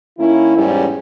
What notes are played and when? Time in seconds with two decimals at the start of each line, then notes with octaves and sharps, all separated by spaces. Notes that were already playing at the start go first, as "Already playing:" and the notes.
0.19 D#3 A#3 C#4 E4
0.57 E2 G#2 G3 C#4